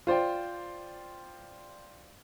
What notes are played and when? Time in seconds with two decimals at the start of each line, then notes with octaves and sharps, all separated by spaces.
0.07 F4 C5 D5 G5